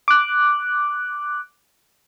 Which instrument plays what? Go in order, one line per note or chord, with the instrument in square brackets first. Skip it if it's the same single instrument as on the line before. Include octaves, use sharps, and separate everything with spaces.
[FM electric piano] D6 F#6